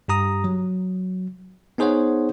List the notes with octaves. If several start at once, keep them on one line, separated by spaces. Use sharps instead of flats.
G2 G4 A#5 D#6
F#3
B3 D#4 G#4 C5 C#5 F#5